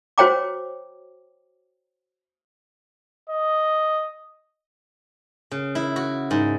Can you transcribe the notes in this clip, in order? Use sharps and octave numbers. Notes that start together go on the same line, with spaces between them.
F#4 C5 C#5 G5 A#5 D6
D#5
C#3
E4
F#4
G#2